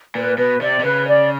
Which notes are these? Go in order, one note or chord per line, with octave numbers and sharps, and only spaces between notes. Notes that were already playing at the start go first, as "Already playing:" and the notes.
A#2 B4
B2 B4
C3 D5
C3
C#3 B4
D5